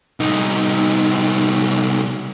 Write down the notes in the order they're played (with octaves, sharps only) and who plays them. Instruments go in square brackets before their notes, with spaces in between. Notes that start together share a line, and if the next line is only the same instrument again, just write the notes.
[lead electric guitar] C2 D#4